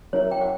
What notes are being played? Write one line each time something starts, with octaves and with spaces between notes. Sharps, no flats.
F#3 C#4 E4 A#4 C#5 E5
G5
F#5